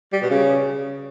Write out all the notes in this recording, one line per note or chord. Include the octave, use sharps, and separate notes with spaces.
G3
B2
C#3